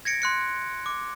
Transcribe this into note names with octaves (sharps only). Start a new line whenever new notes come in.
G#6 A#6 C#7 D7
C6 F#6 C#7
D6